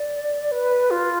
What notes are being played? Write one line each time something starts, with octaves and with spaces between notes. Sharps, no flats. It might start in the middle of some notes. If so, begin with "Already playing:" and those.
Already playing: D5
B4
F4